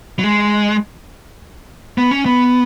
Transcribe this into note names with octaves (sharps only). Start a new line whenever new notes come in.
F#3
G#3
B3
C#4
B3